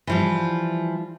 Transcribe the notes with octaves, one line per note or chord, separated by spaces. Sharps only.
E3 F3 G3